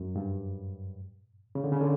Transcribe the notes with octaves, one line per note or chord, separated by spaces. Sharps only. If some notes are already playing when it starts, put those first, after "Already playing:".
Already playing: F#2
G2
C#3
D3
C#3
D3